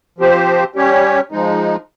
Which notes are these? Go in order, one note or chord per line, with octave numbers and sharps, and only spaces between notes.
F3 C4 G4 C5
G3 C#4 G4 C#5
F3 G#3 D#4